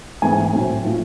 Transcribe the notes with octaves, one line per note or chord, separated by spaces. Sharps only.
G#2 E3 A3 C4 G#5
A2 F#3 A3 C4
F3 A3